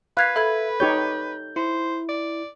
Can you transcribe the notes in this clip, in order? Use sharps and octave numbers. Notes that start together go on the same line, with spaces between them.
B4 F5 F#6 G#6 B6
A4 E5 B5 G#6
D#4 G4 C#5 G6
E4 C5
D5